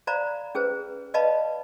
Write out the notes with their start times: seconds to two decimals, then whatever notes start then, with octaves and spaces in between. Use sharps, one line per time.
0.07 C5 D5 F5 A#5 B5
0.55 C#4 G#4 B4 C5
1.14 B4 D5 D#5 F5 A5 B5